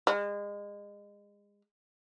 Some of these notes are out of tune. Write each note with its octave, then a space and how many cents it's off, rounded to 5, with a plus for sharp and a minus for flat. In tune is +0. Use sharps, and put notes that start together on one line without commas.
G#3 -30